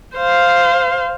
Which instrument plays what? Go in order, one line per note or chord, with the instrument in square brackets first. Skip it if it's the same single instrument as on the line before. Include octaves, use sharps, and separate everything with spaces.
[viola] C5 F5